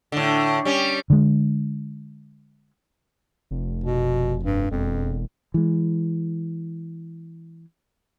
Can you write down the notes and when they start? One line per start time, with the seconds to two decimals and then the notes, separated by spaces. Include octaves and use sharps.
0.12 A2 D3
0.65 G3 C#4
1.10 D3 G#3
3.51 F1
3.84 B2
4.44 G2
4.71 E1 F2
5.54 E3 G#3